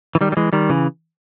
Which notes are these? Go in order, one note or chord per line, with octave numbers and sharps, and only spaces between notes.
E3
D#3 G3
G3
E3 G#3
D#3 G3
C#3 E3